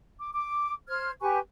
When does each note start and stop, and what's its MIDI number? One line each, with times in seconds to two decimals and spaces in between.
0.20 0.30 86
0.33 0.75 86
0.88 1.11 72
0.88 1.11 89
0.88 1.11 92
1.21 1.39 67
1.21 1.39 71
1.21 1.39 80
1.21 1.39 85